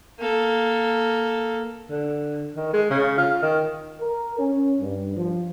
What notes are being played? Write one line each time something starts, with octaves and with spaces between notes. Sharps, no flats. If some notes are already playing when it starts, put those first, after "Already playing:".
A#3 A4
D3
D#3
G#3
C#3
F4
D#3
A#4
C#4
G2
F3